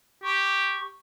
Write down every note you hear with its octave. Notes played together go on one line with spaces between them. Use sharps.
G4 C#6